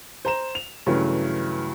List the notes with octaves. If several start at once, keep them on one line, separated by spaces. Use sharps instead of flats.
C5 A#5 E7
F7
G2 C#3 E3 F#3 A3